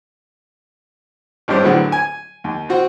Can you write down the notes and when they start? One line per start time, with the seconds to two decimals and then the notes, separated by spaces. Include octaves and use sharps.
1.48 G#1 G2 C#4 G4 C5
1.62 A2 D3 F#3 B3 C4 G#4
1.92 G#5
2.44 D#2
2.69 C4 F#4 C5